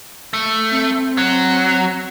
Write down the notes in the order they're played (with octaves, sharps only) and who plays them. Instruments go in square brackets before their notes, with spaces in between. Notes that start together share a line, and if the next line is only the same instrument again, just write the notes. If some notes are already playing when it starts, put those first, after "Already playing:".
[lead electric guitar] A3
[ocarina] C4
[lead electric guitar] F#3